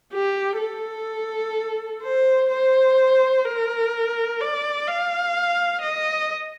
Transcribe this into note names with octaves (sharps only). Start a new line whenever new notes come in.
G4
A4
C5
C5
A#4
D5
F5
D#5